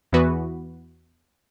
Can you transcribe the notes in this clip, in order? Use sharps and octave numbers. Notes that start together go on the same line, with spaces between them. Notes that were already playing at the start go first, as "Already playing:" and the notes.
E2 E3 B3 F#4 B4